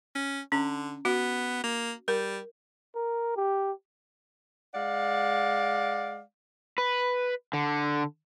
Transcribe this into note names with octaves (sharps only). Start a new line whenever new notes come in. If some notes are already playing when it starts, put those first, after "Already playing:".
C#4
D3 C#4
B3 F#4
A#3
G3 A#4
A#4
G4
G#3 D5 F5 F#5
B4
D3